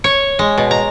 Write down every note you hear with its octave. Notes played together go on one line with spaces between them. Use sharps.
C#5
G#3
B2
A#5